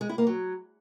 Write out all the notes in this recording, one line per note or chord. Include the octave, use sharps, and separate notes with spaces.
G#3
E4
A#3
F#3